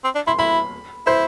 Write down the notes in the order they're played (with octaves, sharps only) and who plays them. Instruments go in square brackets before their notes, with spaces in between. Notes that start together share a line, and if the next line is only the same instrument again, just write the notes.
[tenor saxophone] C4
D4
[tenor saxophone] E4 [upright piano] C6
[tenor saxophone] E4 [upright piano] B5
[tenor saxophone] E4 [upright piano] C5